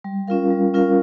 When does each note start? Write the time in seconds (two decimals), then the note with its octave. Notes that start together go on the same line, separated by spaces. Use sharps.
0.04 G3
0.28 C#4 F4 A#4 F5
0.50 G3
0.74 C#4 F4 A#4 F5